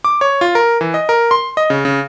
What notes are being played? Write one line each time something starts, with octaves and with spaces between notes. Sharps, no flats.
D6
C#5
F4
A#4
E3
D#5
A#4
C6
D#5
C#3
C#3